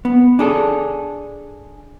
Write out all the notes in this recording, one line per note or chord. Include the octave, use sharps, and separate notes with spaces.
B3
D4 G#4 A4